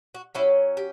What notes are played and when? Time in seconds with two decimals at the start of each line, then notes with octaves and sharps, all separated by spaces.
0.14 F#4
0.35 F#3 C#4 E4 G4
0.77 G4